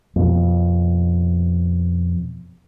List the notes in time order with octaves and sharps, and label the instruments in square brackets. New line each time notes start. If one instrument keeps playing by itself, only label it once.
[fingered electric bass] F2 B2